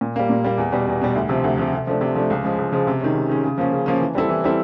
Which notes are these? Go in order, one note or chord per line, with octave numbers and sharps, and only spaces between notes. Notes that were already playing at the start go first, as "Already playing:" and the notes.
A#2
G3 A#3
A#2
G3 A#3
E2
B2 G3
E2
B2 G3
D2
C3 F3
D2
C3 F3
C3
F3 A3 D4
C3
F3 A3 D4
C#2
C#3 F3 G#3
C#2
C#3 F3 G#3
C3
D#3 G#3 C#4
C3
D#3 G#3 C#4
C#3
F3 A#3 C#4
C#3
F3 A#3 C#4
E3
G3 C4 E4 A4
E3
G3 C4 E4 A4